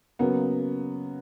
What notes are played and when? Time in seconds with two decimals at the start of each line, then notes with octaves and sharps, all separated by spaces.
0.19 C#3 F#3 A#3 B3